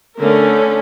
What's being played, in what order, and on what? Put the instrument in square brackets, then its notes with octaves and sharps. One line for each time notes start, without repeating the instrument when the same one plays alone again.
[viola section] D3 A3 C#4 A#4